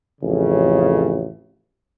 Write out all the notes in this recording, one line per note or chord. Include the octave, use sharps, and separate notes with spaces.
A1 F2 C#3